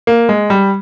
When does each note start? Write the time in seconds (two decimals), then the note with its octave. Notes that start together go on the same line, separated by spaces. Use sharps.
0.07 A#3
0.29 G#3
0.50 G3